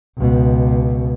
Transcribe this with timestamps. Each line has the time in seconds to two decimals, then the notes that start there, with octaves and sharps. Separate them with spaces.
0.18 C#2 B2